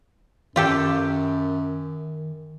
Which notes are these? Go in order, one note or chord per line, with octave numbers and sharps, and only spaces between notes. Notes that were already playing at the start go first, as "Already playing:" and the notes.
F#2 D#3 F4 G4 A4